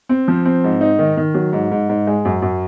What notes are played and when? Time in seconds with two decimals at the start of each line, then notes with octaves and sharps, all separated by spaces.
0.09 C4
0.28 F3
0.45 C4
0.64 G#2
0.81 D#4
0.99 D#3
1.17 D#3
1.35 F#3
1.53 G#2
1.71 G#2
1.89 G#2
2.07 G#3
2.25 F#2
2.42 F#2